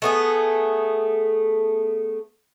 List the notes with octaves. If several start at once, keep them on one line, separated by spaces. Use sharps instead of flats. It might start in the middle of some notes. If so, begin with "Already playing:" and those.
A3 B3 G#4